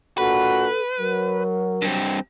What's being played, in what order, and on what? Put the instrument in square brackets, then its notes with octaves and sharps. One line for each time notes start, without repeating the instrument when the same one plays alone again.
[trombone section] A#2 D4 F#4 [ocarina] A4 [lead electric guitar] B4
[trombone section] F#3 [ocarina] A#4
[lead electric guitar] G2 C4